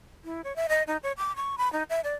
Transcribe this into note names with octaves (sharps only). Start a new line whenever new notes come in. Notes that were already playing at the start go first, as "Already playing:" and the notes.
E4
C#5
E5
D#5
D#4
C#5
D6
C#6
B5
D#4
E5
D5